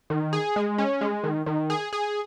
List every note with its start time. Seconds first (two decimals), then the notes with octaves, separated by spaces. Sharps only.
0.10 D#3
0.33 G#4
0.56 G#3
0.78 C#4
1.01 G#3
1.24 D#3
1.46 D#3
1.70 G#4
1.93 G#4